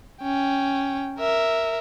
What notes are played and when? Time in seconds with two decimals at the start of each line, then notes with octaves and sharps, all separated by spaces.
0.22 C#4 G5
1.19 A#4 E5